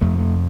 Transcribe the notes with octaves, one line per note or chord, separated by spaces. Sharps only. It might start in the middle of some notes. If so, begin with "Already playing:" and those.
F2 C3 A3
A3